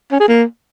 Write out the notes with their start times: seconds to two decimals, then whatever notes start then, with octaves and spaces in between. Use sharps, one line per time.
0.11 C#4
0.20 G#4
0.28 A#3